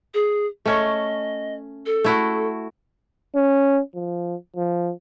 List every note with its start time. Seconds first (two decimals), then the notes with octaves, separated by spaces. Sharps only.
0.14 G#4
0.66 A3 C#4 C#5 D#5
1.86 A4
2.04 A3 E4 F#4
3.36 C#4
3.95 F3
4.56 F3